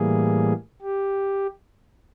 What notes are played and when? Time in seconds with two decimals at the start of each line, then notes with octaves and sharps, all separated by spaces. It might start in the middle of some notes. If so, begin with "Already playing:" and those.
Already playing: A2 E3 G3 A#3 G#4
0.82 G4